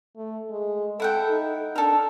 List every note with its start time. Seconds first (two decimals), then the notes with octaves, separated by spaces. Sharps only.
0.16 A3
0.50 G#3
1.00 E4 A4 F#5 G5
1.30 D#4
1.76 D4 A4 A#4